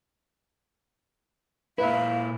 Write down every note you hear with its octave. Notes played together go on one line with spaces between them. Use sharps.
A#2 E4 B4 E5 F5